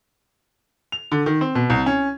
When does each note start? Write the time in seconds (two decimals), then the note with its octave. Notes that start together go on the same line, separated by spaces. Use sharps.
0.92 F7
1.12 D3
1.26 D#3
1.41 C4
1.55 B2
1.70 C2
1.86 C#4